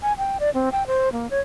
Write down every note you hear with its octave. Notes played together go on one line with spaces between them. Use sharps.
G#5
G5
D5
C4
G5
C5
A#3
C#5